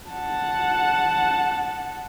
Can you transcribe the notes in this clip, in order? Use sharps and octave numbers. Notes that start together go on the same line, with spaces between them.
F#5 A5